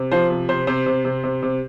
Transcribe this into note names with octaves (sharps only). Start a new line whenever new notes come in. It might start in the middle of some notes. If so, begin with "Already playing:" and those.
Already playing: C3
F3 C5
C3
C3 C5
C3 C5
C3
C3
C3
C3